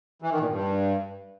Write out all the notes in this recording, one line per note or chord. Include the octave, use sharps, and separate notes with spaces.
E3
D#3
A#2
G2